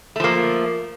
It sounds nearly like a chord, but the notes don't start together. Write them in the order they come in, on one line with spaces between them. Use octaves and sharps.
A3 F3 A#3